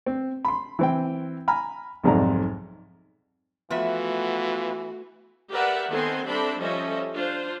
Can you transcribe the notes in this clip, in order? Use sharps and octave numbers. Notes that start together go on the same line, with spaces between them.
C4
B5 C6
E3 C4 G5
G#5 A#5 B5 F6
B1 F2 G#2 C3 D5 A#5
E3 F3 A3 B3 F4 F#4 B4 E5
G4 A#4 B4 D5 E5 F#5
D#3 B3 C4 A4 G#5 C6
G3 C4 D4 A4 E5 B5
F3 G3 C#4 A4 D#5 E5
D4 F4 C5